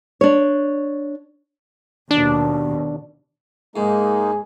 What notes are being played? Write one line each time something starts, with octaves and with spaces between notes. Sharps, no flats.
D4 C#5
D#2 B2 D4
G#2 G#3 A#3 D#4 G#4